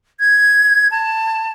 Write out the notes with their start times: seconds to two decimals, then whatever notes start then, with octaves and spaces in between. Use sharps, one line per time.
0.20 G#6
0.91 A5